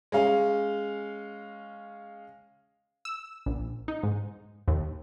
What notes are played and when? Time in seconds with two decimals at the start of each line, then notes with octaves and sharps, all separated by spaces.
0.12 G#3 C#4 F5
3.05 E6
3.46 A#1
3.88 D#4
4.03 G#2
4.68 D#2